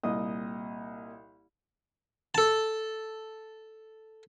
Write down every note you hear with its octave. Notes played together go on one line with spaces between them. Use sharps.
C2 A#2 D#5 D#6
A4 A5